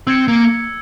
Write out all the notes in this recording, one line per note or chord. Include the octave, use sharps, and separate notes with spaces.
C4 E6 G#6 C#7
A#3